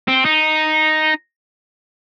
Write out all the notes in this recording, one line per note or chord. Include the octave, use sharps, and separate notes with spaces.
C4
D#4